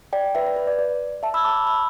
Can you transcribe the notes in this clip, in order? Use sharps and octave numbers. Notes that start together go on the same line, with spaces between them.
D5 G5
B4 E5
D5
B4
D5
D5
E5 A5
B5 E6
A5 D6
B5 E6